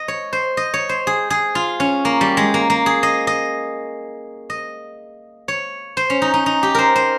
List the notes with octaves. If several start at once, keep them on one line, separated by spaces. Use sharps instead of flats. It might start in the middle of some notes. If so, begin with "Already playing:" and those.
Already playing: D#5
C#5
C5
D#5
C#5
C5
G#4
G#4
F4
C#4
A#3
G3
G#3
A#3
A#3
G#4
D#5
D#5
D#5
C#5
C5
C#4
D#4
D#4
D#4
G4
A#4 C5
C5